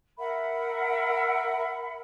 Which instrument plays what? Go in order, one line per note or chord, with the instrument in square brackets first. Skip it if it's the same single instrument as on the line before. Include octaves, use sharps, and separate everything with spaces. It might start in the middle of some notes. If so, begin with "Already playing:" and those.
[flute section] A#4 E5 F#5 B5